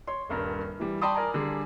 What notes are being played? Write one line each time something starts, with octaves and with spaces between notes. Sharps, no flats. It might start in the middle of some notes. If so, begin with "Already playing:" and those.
C#5 C6
D#1 G2 A#4
E3 G3
D5 G5 A5 B5 C6 D#6
A#4 D5 G#5 A#5
D3 G3 G#4